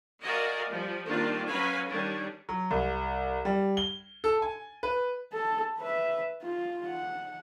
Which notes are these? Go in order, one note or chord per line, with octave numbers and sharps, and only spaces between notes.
F#4 A#4 D5 D#5 F5 G#5
F3 G3
D#3 G3 A#3 C4 D4 F4
F#3 C#4 B4 F5 G#5 B5
D#3 G3 C#4 D4
F#3
C2
G3
G7
A4
G#5
B4
A4
B4 E5
F4
F#5